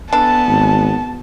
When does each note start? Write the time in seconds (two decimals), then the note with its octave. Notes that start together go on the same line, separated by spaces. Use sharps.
0.13 E3 B3 D4 A4 A5
0.48 G#1